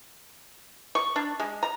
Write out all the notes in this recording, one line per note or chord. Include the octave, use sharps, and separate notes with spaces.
C#6
D4
G#3
A#5